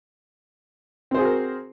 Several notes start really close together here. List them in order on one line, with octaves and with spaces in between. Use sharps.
C4 C5 G#4 F#4 A#4